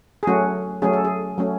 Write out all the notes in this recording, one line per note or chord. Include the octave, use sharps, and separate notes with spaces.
G#4
F#3 A3 C#4 F#4
F#3 A3 C#4 G#4
A4
G#4
F#3 A3 C#4